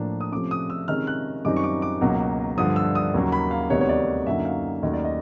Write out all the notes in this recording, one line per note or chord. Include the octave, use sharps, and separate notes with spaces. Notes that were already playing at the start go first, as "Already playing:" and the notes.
Already playing: A2 F3 A#3 D4
D#6
C3 F3 A3 C#4 D6
D#6
E6
C3 D#3 G#3 C#4 F6
F#6
F#2 D#3 G3 C4 D#4 D6
C#6
D6
D6
C#2 B2 F#3 A#3
G2 D3 F3 D#6
E6
D#6
D#2 C#3 F#3 A#3
B5
F5
D2 C3 D#3 G3 B3 C#5
C#5
D5
F#2 D3 F#3 A#3 D#4 E5
F5
D#2 D#3 F#3 A3 C#4 D#5
D5
D#5